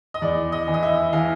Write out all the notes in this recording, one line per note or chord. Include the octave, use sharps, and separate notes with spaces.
D#5
E2 D5
D#5
E3
D#5
E5
E3 F5